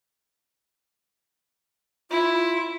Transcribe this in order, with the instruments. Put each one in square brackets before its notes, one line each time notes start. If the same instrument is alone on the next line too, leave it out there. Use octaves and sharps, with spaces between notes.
[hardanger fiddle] E4 [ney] F4